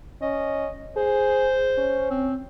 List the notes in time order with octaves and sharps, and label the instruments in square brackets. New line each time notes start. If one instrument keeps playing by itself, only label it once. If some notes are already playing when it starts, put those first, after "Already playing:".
[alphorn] C#4 [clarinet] D#5
[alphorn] G#4 [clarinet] C5
[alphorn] C#4
[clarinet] C4